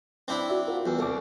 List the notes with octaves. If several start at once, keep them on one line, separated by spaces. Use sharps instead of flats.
C4 D4 E4
F#4 D5 E5
F4 F#4 A#4
E2
C2 A4 G5 D6